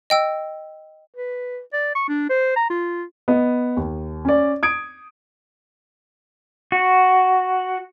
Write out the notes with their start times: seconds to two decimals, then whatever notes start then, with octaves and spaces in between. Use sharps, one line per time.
0.10 D#5 G5 E6
1.14 B4
1.73 D5
1.95 C#6
2.09 D4
2.29 C5
2.56 A#5
2.70 F4
3.28 B3 D#5
3.77 D#2
4.25 C#4 D5
4.63 D#6 G#6 D7
6.72 F#4